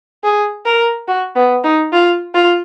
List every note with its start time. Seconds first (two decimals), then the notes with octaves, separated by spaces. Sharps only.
0.24 G#4
0.65 A#4
1.08 F#4
1.36 B3
1.64 D#4
1.92 F4
2.34 F4